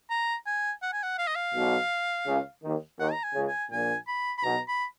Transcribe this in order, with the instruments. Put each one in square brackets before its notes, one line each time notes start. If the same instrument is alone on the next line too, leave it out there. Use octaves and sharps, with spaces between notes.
[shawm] A#5
G#5
F#5
G#5
F#5
F5
D#5
F5
[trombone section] B1 B2
C#2 C#3
D#2 D#3
[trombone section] D#2 D#3 [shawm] F#5
[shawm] A#5
G#5
[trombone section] C#2 C#3
[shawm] G#5
[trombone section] A#1 A#2 [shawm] G#5
[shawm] B5
B5
[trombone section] B1 B2 [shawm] A#5
[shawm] B5